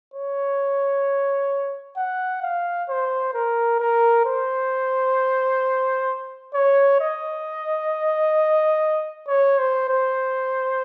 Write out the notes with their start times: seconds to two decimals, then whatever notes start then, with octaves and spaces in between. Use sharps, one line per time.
0.14 C#5
1.97 F#5
2.43 F5
2.89 C5
3.34 A#4
3.80 A#4
4.26 C5
6.54 C#5
7.00 D#5
9.28 C#5
9.59 C5
9.89 C5